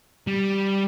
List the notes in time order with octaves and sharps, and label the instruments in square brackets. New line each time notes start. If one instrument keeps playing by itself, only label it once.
[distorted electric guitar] G3